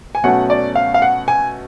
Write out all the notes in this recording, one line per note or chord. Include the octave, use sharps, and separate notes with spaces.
G#5
B2 F#3 A3 C#4 F#5
D5
F5
F5
F#5
G#5